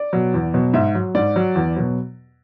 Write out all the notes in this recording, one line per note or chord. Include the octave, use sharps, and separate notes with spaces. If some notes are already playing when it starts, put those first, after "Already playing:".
Already playing: D5
B2 F#3
E2
B2 F#3
G#2 E5
F#3
G#2 D5
F#3
E2
B2 F#3